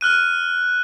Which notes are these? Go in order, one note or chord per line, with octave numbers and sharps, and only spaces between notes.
F6 F#6 D#7